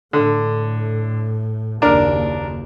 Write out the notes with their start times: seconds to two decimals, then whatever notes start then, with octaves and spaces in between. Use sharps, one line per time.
0.13 A2 D3
1.82 F#1 D#2 D4 A#4